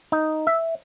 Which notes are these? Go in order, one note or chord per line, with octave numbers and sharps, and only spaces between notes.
D#4
E5